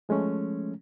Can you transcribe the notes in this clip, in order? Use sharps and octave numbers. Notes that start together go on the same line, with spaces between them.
F3 G#3 A3 C#4